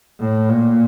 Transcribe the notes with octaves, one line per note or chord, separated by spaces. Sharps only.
A2
A#2